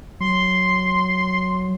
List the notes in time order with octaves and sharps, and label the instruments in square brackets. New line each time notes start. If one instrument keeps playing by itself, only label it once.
[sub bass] F#3 [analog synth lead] C6